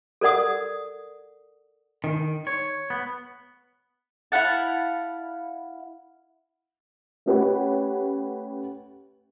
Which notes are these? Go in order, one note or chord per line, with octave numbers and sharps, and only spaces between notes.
A4 A#4 D5 F#5 D#6
D#3
C#5
B3
E4 F5 F#5 A5
A3 C#4 G4 B4 C#5 F#5